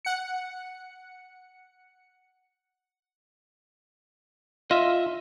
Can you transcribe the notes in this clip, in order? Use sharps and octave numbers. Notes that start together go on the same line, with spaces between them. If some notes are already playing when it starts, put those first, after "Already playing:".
F#5 C#7
F4 D#5 E5